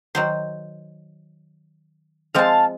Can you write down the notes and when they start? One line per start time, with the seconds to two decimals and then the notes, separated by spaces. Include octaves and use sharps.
0.15 D#3 F#3 C5
2.35 F3 G#3 C4 F5 A5